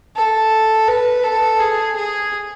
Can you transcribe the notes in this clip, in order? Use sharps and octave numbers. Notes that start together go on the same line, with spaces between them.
A4
B4
A4
G#4
G#4